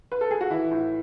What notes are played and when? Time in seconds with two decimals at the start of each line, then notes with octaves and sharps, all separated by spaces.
0.12 B4
0.21 A4
0.31 G#4
0.41 F#4
0.51 E3 E4
0.71 A2